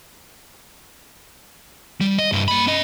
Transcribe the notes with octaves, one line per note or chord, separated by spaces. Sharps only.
G3
D#5
G2 E4
A#3 B5
C#4 D#5